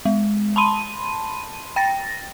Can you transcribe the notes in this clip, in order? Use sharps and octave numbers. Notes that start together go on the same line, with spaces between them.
G#3
A5 B5 C6 D#7
G5 A6 A#6